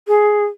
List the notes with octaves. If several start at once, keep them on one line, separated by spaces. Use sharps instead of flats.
G#4